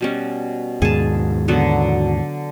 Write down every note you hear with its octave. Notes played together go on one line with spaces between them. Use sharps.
B2 G3 C#4
D#2 G#2 B2 G#4 A5
D3 F#3 B3